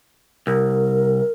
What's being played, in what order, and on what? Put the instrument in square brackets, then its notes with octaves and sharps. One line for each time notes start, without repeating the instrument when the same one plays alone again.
[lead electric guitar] C2 [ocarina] A#4